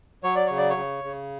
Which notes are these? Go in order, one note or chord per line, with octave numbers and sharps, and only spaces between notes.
F#3 C#5
D5
C#3 C#5
D5
C#5
C#3
C#3